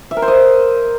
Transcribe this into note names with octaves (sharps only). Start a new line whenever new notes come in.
E5
A#4
C5
D#5